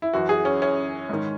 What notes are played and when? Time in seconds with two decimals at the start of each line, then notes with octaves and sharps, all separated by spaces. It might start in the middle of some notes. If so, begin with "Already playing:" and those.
0.02 E4
0.13 F#2 E3 F#4
0.29 G#4
0.45 C#4
0.62 C#4
1.09 G#2 D#3